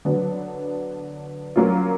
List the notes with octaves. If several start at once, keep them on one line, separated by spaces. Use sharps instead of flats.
D3 F#3 B3
F#3 A#3 C#4 F4